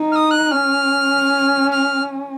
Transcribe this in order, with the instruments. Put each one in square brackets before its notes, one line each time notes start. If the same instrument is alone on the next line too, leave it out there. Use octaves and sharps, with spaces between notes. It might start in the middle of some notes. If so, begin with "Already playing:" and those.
Already playing: [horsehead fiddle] D#4
[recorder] F6
D#6
F#6
[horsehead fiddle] C#4 [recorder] F6
[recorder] F6